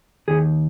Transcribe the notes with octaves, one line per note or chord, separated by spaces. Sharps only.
D#2 D#3 G#4